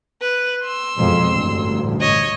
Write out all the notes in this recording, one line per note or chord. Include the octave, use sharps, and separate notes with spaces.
B4
C6 E6
F2 B2 G#3
A1 D2 G2
C#5 D#5